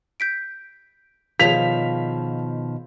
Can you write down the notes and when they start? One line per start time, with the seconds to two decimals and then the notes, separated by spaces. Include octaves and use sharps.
0.20 G6 B6 D7
1.40 B2 D#3 F3 G#4 C#5 F5 B6 F7